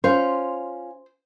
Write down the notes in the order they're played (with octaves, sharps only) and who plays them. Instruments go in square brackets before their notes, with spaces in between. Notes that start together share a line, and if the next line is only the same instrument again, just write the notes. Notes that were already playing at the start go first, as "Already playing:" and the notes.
[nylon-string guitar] C#4 F4 [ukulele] C5